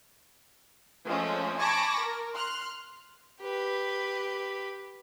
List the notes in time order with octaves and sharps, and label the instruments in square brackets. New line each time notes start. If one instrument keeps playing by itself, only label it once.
[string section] F3 G#3 A3 C#4
G#5 A5 B5 C#6 D6 A#6
A#4
C6 F6 F#6
[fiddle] G4 B4